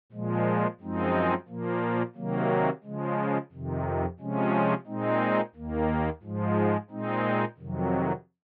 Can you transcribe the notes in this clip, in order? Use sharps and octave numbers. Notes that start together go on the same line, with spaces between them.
A#2 F3 G#3
F#2 F3 G#3 C4 D#4
A#2 F3 A#3
C3 D#3 F#3 A#3
C#3 F3 G#3
F2 C3 D#3
C3 F3 G#3 C#4
A#2 G#3 C4 D#4
D#2 D#3 A#3
G#2 F3 G#3
A#2 G#3 C4 D#4
F2 C3 D#3 F#3